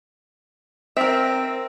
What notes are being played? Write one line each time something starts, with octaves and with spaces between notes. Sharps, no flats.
C4 A#4 E5